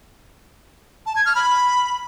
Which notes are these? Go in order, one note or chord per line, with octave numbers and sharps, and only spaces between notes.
A5
G#6
F6
B5